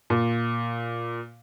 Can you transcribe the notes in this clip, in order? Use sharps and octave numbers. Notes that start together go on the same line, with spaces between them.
A#2